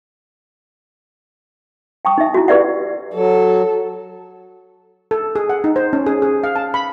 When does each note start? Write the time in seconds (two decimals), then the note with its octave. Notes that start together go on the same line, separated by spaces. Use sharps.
2.05 G5 A5 C#6 D#6
2.18 D#4 E5
2.34 E4 F#4
2.48 G4 B4 D5 E5 F#5
3.14 F#3 A4
5.11 A4
5.36 G#4
5.50 F#5
5.64 D#4
5.76 C5
5.93 C#4
6.06 G#4
6.22 G#4
6.44 F5
6.56 A5
6.74 B5